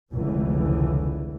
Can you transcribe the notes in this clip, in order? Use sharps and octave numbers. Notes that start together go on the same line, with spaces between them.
F1 C#2 D3 E3